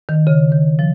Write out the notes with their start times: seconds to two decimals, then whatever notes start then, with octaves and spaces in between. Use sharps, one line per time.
0.09 D#3
0.27 C#3
0.52 D#3
0.79 F3